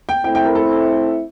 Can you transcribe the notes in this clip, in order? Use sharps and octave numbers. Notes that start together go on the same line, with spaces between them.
G5
A3 C4 E4 G5
G5
A#4
A4